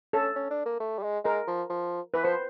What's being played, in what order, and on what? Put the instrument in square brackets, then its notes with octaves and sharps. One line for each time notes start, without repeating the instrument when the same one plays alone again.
[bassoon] C#4 [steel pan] A4
[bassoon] C#4
D4
A#3
A3
G3
G#3
[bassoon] G#3 [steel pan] A#4
[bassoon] F3
F3
[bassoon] E3 [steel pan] B4
[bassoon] F3 [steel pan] C5